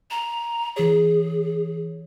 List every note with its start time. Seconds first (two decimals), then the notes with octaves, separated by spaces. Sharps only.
0.11 A#5
0.76 E3 G#4 C#5